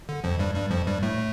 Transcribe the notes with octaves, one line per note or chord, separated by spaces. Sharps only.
D3
F2 F3
G2 G3
G2 G3
F2 F3
G2 G3
A2 A3